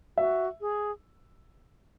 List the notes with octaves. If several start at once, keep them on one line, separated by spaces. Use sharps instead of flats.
F#4 E5
G#4